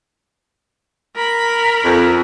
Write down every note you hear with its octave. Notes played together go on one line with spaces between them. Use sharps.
A#4 B5
F2